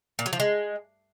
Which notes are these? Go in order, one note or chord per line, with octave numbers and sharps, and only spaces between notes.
A#2
F#3
F3
G#3